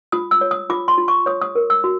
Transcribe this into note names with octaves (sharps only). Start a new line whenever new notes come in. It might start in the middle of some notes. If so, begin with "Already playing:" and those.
F4 D#6
E6
C#5
D#6
F4 D6
C6
F4
C#6
C#5 D#6
D#6
A#4
E6
F#4